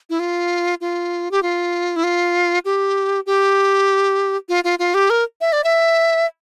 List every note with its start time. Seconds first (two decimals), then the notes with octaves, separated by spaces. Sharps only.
0.10 E4
0.19 F4
0.81 F4
1.31 G4
1.42 F4
1.96 E4
2.03 F4
2.65 G4
3.26 G4
4.49 F4
4.64 F4
4.79 F4
4.94 G4
5.10 A#4
5.41 E5
5.52 D5
5.64 E5